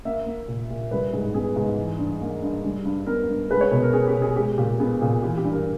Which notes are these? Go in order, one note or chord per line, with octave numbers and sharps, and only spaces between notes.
A#3 E5
A#3
A#2
A#2
G3 B4
G#2 G#4
B3 G#4
G#2
E3
G2
A#3
G2
G3
G2
B3 A#4
G2
G#3 B4
C#5
B2 B4
A#4
B3 G#4
G4
B2
G#4
G#3 G4
A#2 G4
B3 G#4
A#2 G#4
E3 G4
G4
G2
A#4